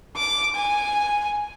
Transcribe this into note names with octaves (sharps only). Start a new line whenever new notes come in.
D6
G#5